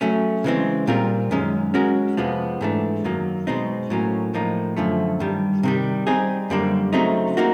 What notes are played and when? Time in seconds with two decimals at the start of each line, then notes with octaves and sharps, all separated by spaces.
0.01 F#3 A3 C#4
0.44 C#3 E3 G#3 C4
0.87 A#2 G3 C4 F4 A#4
1.31 F#2 D#3 G#3 C#4
1.74 G#3 C#4 F#4 A#4
2.17 F2 C3 F3 G#3 B3
2.61 G#2 E3 A3 D4
3.04 F#2 D#3 F#3 A#3
3.47 B2 G#3 C4 D#4
3.90 A2 F#3 A#3 C#4
4.34 A2 F3 A#3 D#4
4.77 F#2 D3 F3 A3
5.20 G2 D#3 G3
5.63 C3 D#3 G3
6.07 G3 C4 D#4 G#4
6.50 F#2 D3 G3 A#3 D4
6.93 C#3 F#3 A3 C4 D#4
7.37 A#3 D#4 F#4 A#4